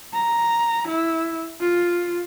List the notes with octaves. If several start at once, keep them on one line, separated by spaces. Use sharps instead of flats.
A#5
E4
F4